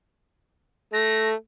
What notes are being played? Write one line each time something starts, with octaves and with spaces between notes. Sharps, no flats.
A3 A#6